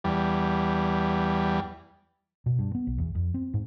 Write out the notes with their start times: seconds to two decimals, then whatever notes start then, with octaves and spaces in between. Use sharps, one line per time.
0.04 E2 G3
2.46 B2
2.59 G2
2.75 B3
2.87 B1
2.98 E2
3.15 F2
3.34 C4
3.54 G#2